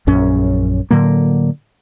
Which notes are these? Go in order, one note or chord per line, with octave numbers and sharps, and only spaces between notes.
A#1 F#2 C#4
A2 D3 F#3 A#3